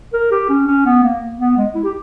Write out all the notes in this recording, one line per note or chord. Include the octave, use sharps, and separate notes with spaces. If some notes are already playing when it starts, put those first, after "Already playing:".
A#4
G4
C#4
C#4
B3
A#3
B3
G#3
E4
G4